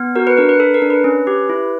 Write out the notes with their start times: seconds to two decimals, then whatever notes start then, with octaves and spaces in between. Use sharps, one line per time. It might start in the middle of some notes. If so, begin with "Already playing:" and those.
Already playing: B3
0.16 F#4 A#4
0.27 B4
0.37 D4 A#4
0.49 B4
0.60 A4
0.74 A#4
0.82 D4
0.90 B4
1.04 C#4
1.27 G4
1.50 E4